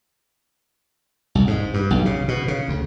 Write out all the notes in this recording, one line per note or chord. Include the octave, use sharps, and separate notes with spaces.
C2
G#2
G2
B1
C#3
B2
C#3
D2